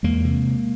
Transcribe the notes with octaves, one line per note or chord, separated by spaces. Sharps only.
E2 G#3 A#3
C3